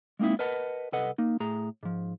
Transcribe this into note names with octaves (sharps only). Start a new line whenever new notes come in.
G#3 A#3 C4 D#4 E4
A#4 B4 D#5 F#5 A5
C2 A4 B4 D#5 F#5
A#3 D#4
A2 G#4 A#5
G#2 F3